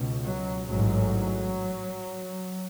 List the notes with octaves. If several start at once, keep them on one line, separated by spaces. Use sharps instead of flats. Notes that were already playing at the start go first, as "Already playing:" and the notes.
Already playing: C#2 B2
F#3
A1 G#2 F#3